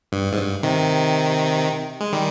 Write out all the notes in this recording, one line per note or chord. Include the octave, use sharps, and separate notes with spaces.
G2
G#2
G2
C3 D#3
G#3
D#3 G3